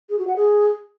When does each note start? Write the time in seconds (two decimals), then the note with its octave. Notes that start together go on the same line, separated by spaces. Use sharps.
0.10 G#4
0.18 F#4
0.27 F#5
0.36 G#4